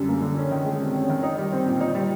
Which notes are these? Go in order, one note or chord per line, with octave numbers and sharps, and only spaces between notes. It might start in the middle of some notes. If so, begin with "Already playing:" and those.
Already playing: F#2 D3 G3
A#3
D3
C#4
D#3
G#3
C3
C#4
D#3
D#4
G3
C4
A#2
D#4
G3